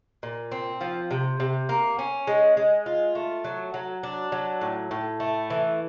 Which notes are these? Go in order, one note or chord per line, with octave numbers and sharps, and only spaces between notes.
A#2
C4
F3
C3
C3
A#3
C#4
G#3
G#3
F4
A3
F#3
F#3
D4
F#3
A2
A2
A3
E3